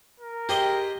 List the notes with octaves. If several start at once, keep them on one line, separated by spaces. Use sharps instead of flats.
A#4
G4 G#4 C5 D#5